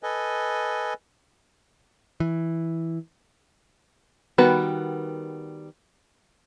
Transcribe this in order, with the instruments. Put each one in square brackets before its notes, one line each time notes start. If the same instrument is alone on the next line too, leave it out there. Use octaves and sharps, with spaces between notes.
[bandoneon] A4 B4 D#5 G#5
[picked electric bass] E3
[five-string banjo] D#3 G3 B3 F#4 B4